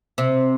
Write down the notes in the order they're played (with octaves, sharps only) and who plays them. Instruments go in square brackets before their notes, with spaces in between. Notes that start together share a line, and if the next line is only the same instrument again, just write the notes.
[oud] C3